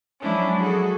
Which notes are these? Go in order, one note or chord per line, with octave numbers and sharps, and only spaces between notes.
F3 F#3 G#3 C#4 D4 E4
F#4 G#4 A4